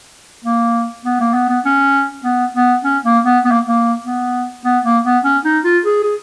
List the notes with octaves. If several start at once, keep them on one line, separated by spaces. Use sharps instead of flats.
A#3
B3
A#3
B3
B3
C#4
B3
B3
C#4
A#3
B3
B3
A#3
A#3
B3
B3
A#3
B3
C#4
D#4
F4
G#4
G#4